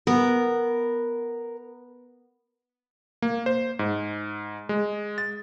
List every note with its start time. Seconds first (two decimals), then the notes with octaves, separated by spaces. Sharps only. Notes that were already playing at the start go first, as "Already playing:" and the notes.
0.07 B3 A#4
3.22 A#3
3.46 C5
3.79 G#2
4.69 G#3
5.18 A6